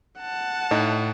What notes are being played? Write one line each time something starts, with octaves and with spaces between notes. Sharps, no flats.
F#5 A5
A2 D#4